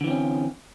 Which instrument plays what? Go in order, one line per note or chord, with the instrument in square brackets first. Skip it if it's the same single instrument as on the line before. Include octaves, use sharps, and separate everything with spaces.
[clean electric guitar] D3
E3
C4
C#4